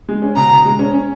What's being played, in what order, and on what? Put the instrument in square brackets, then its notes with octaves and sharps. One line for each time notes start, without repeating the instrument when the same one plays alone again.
[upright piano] G#3
C#4
[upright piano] B2 [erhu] A#5
[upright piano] B2
G#3
C#4
C#4